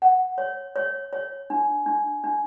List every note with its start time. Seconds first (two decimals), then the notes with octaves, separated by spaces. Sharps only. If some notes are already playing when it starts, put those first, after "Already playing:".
0.02 F#5
0.38 C#5
0.76 C#5
1.13 C#5
1.50 D4
1.86 D4
2.24 D4